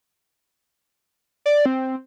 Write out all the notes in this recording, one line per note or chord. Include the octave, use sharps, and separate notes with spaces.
D5
C4